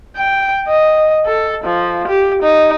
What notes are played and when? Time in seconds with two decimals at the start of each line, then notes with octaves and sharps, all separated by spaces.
0.16 G5
0.68 D#5
1.26 A4
1.64 F3
2.08 G4
2.43 D#4